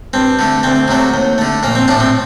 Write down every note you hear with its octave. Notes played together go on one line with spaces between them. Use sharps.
G2 C4
D3 A3
D2 C4
C3 F#3 A3
D#2
D3 A3
A#1 A#3
C4
A2 A3 D4
C4